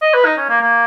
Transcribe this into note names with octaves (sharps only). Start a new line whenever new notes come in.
D#5
B4
D#4
C#4
A#3
A#3